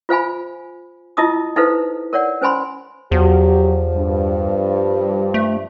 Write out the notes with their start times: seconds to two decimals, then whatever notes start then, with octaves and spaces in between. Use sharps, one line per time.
0.09 F4 C5 F5 G#5 B5
1.17 E4 F4 D#5 A5 D#6 E6
1.56 D#4 E4 A4 B4 C5 F5
2.13 A#4 C#5 D5 F#5
2.41 C#4 C5 G#5 B5 C6
3.12 E2 F3 F#3 G4
3.95 G2
5.34 A3